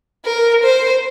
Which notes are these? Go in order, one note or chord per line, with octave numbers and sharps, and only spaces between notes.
A#4
C5